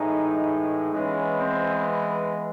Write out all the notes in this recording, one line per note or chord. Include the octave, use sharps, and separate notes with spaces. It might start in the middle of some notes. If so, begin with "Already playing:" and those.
Already playing: A2 E3 G#3 D#4
E3 G#3 B3 C#4
C4